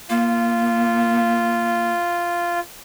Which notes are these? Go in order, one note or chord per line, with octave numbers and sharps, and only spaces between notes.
A#3 F4